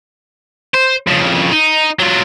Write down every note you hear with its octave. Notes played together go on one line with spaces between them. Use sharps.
C5
F2 C#3
D#4
F#3 F4